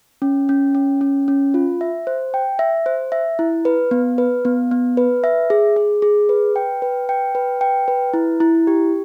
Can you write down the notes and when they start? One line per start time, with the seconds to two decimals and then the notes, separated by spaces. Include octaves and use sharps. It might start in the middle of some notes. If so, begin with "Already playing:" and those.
0.22 C#4
0.49 C#4
0.75 C#4
1.01 C#4
1.28 C#4
1.54 F4
1.81 E5
2.07 C5
2.34 G5
2.59 E5
2.86 C5
3.12 E5
3.39 E4
3.65 B4
3.91 B3
4.18 B4
4.45 B3
4.71 B3
4.97 B4
5.24 E5
5.50 G#4
5.76 G#4
6.02 G#4
6.29 B4
6.56 G5
6.82 B4
7.09 G5
7.35 B4
7.61 G5
7.88 B4
8.14 E4
8.40 E4
8.67 G4